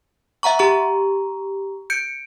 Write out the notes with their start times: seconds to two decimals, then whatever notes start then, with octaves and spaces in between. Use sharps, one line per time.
0.43 E5 F#5 A#5 C#6
0.59 G4 A#5 C#6
1.90 G6 C#7 D7